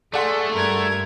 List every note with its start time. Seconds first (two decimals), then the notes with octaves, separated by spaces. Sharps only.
0.13 A3 G#4 A4 D5 F#5 C6
0.54 G2 A#4 G#6